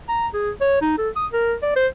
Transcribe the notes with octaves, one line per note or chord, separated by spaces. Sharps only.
A#5
G#4
C#5
D#4
A4
D#6
A#4
D5
C5